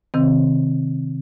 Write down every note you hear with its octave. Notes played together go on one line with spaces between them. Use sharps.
C3 D#3 C4